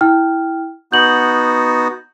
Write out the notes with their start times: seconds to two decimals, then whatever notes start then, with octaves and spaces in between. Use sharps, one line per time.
0.01 E4 G5 F6
0.92 B3 D#4 F#4 G6 F#7